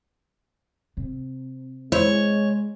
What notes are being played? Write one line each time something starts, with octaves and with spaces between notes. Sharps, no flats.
C3
G#3 E4 C5 C#5